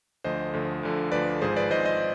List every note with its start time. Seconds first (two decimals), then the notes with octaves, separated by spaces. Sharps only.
0.24 D2 D3 F3 C5 D#5
0.53 D2 D3 F3
0.83 D2 D3 F3
1.12 D2 D3 F3 B4 D5
1.42 G#1 G#2 F3 G#4 C5
1.56 B4 D5
1.71 G#1 G#2 F3 C5 D#5
1.85 C5 D#5